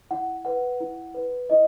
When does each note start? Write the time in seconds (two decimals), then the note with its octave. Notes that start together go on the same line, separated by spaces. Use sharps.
0.11 E4 F#5
0.45 B4 F#5
0.80 E4
1.14 B4
1.50 E4 D#5